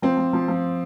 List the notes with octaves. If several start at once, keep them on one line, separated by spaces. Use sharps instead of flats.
F3 C4
F3
F3
F3